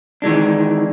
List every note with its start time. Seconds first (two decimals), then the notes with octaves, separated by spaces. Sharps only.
0.22 D#3 E3 G#3 D4